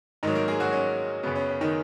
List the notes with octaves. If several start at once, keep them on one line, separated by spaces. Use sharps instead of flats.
G#2 D#3 F#3 D#4
A#3 A#4
G#3 G#4
F#3 F#4
C#4
F#2 C#3 F#3 B3
C#4
C#4
D#3 D#4